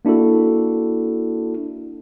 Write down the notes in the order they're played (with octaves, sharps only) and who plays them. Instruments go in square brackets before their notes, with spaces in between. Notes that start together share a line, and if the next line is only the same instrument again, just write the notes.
[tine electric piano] A#3 D4 E4 F#4 A4